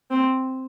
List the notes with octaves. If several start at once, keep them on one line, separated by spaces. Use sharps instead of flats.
C4